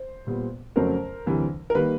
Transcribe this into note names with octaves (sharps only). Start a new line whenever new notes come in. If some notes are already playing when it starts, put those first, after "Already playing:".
Already playing: C5
A#2 G3 B3
F2 C#3 F#3 A3 C#4 A#4 C5
D2 C3 E3 G3
A#4
D#3 G3 A#3 B4